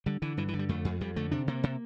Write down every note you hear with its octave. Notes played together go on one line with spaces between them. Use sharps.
D3 G3
D3 E3
G2 E3
E3
D3
G3
F2 A3
F2
F2 G3
D3 A3
C3 D4
C3 A#3
C3